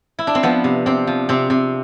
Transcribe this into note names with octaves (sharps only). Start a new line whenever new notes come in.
E4
D4
C4
F3 B3
C3
C3 C4
F3
C3 C4
C3